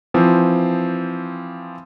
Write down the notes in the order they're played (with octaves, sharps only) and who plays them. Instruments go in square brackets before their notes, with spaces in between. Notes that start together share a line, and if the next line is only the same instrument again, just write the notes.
[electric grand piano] E3 F3 C4